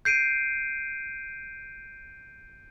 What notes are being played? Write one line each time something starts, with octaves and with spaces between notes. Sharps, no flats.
G6 C7 D7 D#7